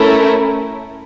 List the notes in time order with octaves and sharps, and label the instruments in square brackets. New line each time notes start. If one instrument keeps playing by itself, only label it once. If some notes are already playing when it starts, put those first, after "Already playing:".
Already playing: [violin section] A3 C#4 E4 A#4